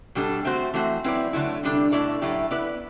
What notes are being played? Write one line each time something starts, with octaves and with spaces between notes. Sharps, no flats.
B2 G3 D4 A4
A3 C4 F#4 C5
E3 A3 C4 F#4 C5
F#3 C4 E4 B4 D5
D3 F#3 A3 E4
C3 G3 D4 A4
B2 A3 E4 A4 D5
A2 F#3 A3 E4 G4
B3 E4 B4 D5